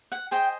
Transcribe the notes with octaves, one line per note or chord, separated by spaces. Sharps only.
F#5
G#4 C5 D#5 G5